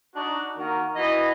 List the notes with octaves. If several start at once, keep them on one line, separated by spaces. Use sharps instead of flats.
D4 D#4 F#4
D#3 A#3 F#4 A#4
E3 F#4 B4 D#5